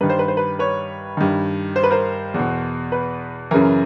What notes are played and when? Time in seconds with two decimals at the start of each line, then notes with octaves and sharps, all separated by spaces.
0.01 G2 D#3 B4
0.10 C5
0.19 B4
0.28 C5
0.37 B4
0.59 B4 C#5
1.17 G2 D#3
1.76 C5
1.84 B4
1.90 A#4 C5
2.34 E2 B2
2.92 B4
3.51 F#2 C#3 E3 A#4